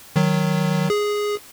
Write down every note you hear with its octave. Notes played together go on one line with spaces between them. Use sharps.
D#3 F#3
G#4